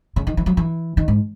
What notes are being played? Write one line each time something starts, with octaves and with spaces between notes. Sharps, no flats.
C#3
D#3
E3
F#3
E3
D#3
G#2